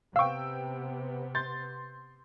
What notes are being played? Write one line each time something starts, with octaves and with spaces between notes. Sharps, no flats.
C3 B3 F5 G5 C#6 E6
C6 G6 A6